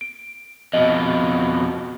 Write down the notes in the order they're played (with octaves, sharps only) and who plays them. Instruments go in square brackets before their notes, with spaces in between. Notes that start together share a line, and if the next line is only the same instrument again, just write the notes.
[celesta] D7
[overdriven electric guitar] F2 B2 [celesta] D#5